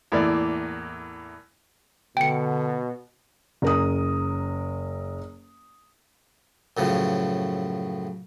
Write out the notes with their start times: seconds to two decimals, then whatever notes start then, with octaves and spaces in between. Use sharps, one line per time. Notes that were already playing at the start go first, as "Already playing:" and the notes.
0.12 E2 A2 A#3 D5
2.17 B2 D3 G5 C#7
3.62 F#1 A#4 D#6
6.77 F#2 A2 C#3 F3